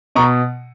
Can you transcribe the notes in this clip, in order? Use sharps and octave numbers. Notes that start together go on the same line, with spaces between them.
B2 A#5 C#6